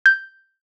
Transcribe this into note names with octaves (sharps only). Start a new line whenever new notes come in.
G6